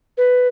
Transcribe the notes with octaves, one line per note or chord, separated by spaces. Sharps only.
B4